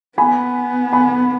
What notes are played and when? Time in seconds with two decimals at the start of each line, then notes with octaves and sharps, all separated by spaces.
0.18 B3 G#5 B5
0.92 G#5 B5